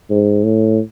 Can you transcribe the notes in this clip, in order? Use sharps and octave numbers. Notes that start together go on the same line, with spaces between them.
G#2
A2